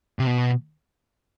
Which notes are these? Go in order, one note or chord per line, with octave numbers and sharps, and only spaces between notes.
C3
B2